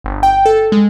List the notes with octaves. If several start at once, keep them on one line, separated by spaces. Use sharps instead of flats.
G1
G5
A4
G#3